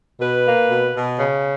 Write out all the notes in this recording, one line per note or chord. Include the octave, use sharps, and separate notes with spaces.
B2 B4
A#3
B2
B2
C#3